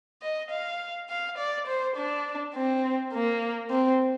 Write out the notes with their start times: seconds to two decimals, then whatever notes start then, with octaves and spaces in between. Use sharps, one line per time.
0.22 D#5
0.51 F5
1.09 F5
1.38 D5
1.67 C5
1.97 D4
2.54 C4
3.13 A#3
3.70 C4